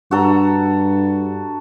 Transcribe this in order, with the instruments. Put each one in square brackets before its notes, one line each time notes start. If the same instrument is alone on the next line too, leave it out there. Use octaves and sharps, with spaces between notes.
[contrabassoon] G2 [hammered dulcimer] F#4 A4 A#5